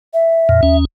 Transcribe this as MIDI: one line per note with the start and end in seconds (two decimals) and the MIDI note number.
0.14 0.76 76
0.49 0.61 41
0.49 0.61 46
0.63 0.85 39
0.63 0.85 61